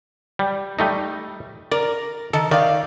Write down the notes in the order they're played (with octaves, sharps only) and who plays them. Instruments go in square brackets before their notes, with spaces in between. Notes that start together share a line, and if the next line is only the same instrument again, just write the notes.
[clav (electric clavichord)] G3
G3 A3 D#4
[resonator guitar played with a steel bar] A#4 [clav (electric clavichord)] D5
[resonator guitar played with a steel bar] D#3 [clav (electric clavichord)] A4
[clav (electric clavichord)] D#3 [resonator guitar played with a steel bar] D5 F5